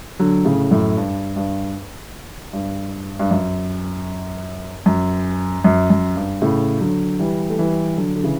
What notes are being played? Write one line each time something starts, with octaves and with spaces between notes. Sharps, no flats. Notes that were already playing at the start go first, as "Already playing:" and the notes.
D3 F#3
A2 C#3
F#2 A2
G2
G2
G2
G2
F#2
F#2
F#2
F#2
G2
A2 C#3
D3 F#3
E3 G3
A3
E3 G3
D3 F#3
D3
C#3 E3